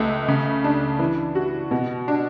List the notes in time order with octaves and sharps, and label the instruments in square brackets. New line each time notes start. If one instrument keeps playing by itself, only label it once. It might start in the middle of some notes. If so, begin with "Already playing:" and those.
Already playing: [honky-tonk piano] C#2 A3
C#3
D4
E3
F#4
B2
D4